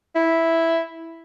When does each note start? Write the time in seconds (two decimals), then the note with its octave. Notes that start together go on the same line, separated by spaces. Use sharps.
0.16 E4